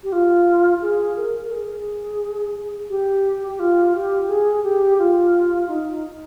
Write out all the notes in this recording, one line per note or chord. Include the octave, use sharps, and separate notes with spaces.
G4
F4
G#4
A#4
A#4
G#4
G4
G4
F4
G4
G#4
G4
F4
D#4